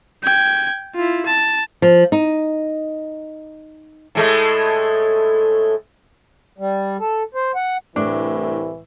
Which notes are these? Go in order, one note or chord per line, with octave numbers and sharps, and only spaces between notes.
G5 G#6
E4 F4
A5
F3
D#4
A2 G#3 A3
G3
A4
C5
F#5
C2 A2 E3 D4